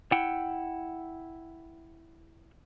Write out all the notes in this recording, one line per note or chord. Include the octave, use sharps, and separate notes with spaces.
E4 F#5 G5